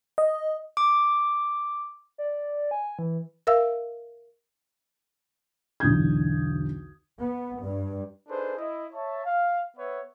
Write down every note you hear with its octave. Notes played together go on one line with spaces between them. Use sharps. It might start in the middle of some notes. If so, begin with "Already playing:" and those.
D#5
D6
D5
G#5
E3
A#4 E5 F5 E6
B1 E2 D3 D#6 G6 G#6
B3
G2
D4 D#4 G#4 A4 B4 C5
E4 D#5
C#5 E5 A5
F5
B3 B4 C#5 E5